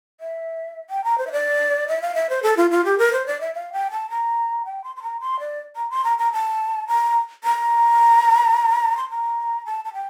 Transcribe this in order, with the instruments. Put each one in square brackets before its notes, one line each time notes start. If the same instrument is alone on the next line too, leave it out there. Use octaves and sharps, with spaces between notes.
[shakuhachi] E5
G5
A#5
C5
E5
D5
E5
F5
E5
C5
A4
F4
F4
G4
A#4
C5
D5
E5
F5
G5
A5
A#5
G5
C6
C6
A#5
C6
D5
A#5
C6
A#5
A#5
A5
A#5
A#5
C6
A#5
A5
A5
G5